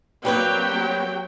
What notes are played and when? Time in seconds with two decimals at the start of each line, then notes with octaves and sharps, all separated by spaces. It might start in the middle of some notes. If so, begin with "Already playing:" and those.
0.25 F#3 G3 A#3 C4 G4 B4 C#5 G5